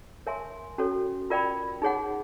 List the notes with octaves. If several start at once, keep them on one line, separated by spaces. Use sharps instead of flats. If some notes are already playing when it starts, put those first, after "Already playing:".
A#4 C#5 E5 G#5 C6
C#4 F#4 A4 C#5
F4 A#4 D5 G5 B5
D#4 G#4 C#5 F#5